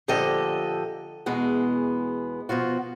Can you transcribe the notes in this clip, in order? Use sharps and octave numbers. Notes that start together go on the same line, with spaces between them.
A#2 D3 F3 G4 A4 D#5
E2 B2 G#3 B3
B2 F3 F4 F#4